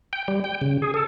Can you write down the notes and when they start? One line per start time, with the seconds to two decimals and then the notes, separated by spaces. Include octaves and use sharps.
0.13 G5
0.28 G3
0.44 G5
0.61 C#3
0.82 G#4
0.94 A4